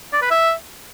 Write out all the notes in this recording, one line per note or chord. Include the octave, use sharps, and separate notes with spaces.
D5
B4
E5